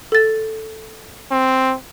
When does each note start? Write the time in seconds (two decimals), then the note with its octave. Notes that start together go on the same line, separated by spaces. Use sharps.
0.12 A4 A6
1.31 C4